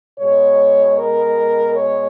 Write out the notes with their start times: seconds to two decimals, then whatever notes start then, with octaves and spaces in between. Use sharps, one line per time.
0.19 B2 G#3 C#5
0.97 A#4
1.75 C#5